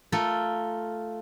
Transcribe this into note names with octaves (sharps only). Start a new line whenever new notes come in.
A3 F4 A4 A#4